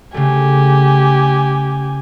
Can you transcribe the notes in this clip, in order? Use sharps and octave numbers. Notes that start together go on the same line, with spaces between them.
C#3 A3 G4 G#5